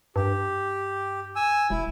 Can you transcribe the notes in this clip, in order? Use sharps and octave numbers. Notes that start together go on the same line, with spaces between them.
G2 G4
G#5 E6
E1 E4